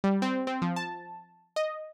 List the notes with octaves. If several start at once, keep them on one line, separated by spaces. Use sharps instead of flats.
G3
C4
C4
F3
A5
D#5